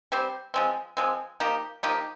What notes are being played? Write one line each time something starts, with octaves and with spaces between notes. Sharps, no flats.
G3 C4 G4 C5
F3 G#3 C4
F3 G#3 C4
F3 A#3 D#4 G4
F3 A#3 D#4 G4